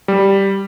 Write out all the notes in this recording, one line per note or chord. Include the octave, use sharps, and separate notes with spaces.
G3